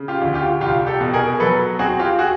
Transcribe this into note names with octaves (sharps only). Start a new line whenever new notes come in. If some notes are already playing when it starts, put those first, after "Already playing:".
Already playing: C#3
F4 G4
D2
F4 G4
C2 F4 G4
G4 A4
B2
G#4 A#4
F#3 A4 B4
C4 F#4 G#4
F4 G4
F#4 G#4